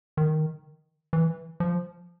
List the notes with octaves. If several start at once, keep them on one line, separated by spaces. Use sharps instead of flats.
D#3
E3
F3